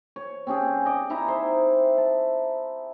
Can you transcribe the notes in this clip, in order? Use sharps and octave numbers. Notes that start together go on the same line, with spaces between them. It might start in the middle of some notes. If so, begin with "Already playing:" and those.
C#5
C4 C#4 G4 G#4
D5 D#5
D#4 E4 E5 A#5
C5
A5